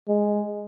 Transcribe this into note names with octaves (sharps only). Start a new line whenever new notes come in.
G#3